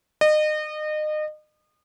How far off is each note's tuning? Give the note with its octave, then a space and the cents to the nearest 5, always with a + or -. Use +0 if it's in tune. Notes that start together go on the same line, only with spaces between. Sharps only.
D#5 -30